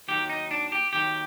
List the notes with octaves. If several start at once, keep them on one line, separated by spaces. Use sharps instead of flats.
D#2 D#3 F#3 G4
D#4
D4
G4
D#2 D#3 F#3 G4